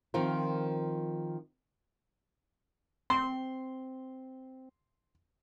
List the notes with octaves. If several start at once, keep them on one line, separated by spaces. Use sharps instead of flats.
D#3 F3 C4 F4 A#4
C4 C6